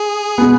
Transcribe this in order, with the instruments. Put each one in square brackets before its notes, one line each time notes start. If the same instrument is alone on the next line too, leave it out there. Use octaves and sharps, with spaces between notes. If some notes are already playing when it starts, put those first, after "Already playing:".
Already playing: [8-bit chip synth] G#4
[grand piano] B2 G#3 B3